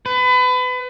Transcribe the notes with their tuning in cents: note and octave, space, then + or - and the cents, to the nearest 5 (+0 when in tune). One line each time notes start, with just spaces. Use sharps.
B4 +30